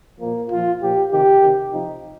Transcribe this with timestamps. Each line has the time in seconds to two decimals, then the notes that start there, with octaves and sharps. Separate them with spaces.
0.20 A#2 F3 A#3
0.50 A#2 F3 F4
0.81 A#2 F3 G4
1.11 C3 D#3 G4
1.42 C3 D#3
1.72 C3 F3 D#4